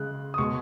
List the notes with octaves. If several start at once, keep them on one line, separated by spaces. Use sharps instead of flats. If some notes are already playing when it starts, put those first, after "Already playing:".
Already playing: C#3 G#3 F#6
D#6
B2 G#3 C#6